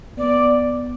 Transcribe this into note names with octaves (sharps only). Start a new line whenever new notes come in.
B3 D5